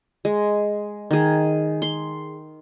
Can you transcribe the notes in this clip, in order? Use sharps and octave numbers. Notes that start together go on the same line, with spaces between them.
G#3
D#3 G#4
C6